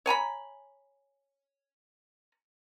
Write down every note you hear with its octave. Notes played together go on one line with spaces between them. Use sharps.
C#5 G#5 A#5 B5